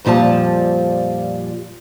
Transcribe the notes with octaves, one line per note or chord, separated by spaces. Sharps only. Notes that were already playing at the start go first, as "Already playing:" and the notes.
F2 A#2 F3 G3 A5